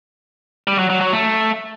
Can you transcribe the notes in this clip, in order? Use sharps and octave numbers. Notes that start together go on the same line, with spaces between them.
G3
F#3
F#3
F#3
A3